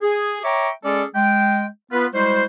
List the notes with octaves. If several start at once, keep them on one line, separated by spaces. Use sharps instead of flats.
G#4
C#5 E5 G5 A#5 C#6 D6
G#3 C#4 G#4 A4 D5
G#3 G5
B3 F4 B4
G3 G#3 E4 F#4 C5